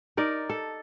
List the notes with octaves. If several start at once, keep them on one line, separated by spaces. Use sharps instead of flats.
D#4 A#4 D5
A4